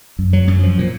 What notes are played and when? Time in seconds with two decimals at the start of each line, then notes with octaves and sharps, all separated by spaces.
0.19 F#2
0.33 F#3
0.47 F#2
0.63 F3
0.78 A#2